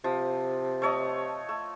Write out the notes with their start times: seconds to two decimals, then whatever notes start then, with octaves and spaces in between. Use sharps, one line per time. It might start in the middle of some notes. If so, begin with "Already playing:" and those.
0.04 C3 F3
0.82 A3 C#5 D#5
1.49 A3